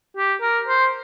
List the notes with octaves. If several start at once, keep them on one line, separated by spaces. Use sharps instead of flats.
G4
A#4
C5